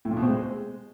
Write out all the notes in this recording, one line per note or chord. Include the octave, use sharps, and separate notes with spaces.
A2
A#2
B2
C4
G#3